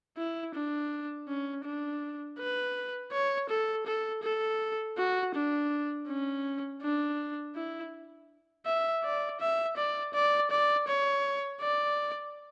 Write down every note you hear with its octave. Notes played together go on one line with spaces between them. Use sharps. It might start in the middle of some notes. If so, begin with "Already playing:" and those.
E4
D4
C#4
D4
B4
C#5
A4
A4
A4
F#4
D4
C#4
D4
E4
E5
D5
E5
D5
D5
D5
C#5
D5